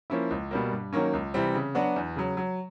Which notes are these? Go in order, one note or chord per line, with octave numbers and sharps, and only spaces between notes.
F3 A#3 C#4 E4
C#2
B2 G3 A#3
G2
D#3 F#3 A#3 C#4
C#2
C3 E3 G3 C4
C#3
F#3 B3 D4 F#4
E2
C#3 F#3
F#3